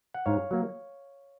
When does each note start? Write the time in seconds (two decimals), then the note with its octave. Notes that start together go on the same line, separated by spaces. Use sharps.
0.14 F#5
0.26 G#2 C#5 F5
0.51 F#3 A#3